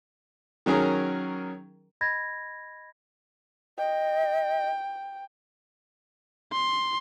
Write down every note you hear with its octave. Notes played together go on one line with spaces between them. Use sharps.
D#3 F#3 C#4 G#4 A#4
D#5 B5 G#6 A#6
D#5 G5
C6